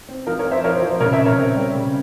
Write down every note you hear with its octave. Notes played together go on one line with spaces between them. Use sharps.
C4
F3 A#4
A#4 C#5
C4
C5 E5
F3 A#4 C#5
C5
F3
C5
C#3 A#4 C#5
C5 E5
C#3
A#4 C#5
C4
G3
C#3